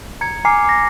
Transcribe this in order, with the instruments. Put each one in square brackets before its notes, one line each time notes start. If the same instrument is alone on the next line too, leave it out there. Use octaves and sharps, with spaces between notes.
[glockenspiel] A#5 G#6 C#7
G#5 A#5 D6 F6 C7 C#7
D6 A#6